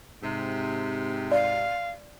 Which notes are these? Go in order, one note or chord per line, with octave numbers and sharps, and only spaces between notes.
G#2 C3
D5 F5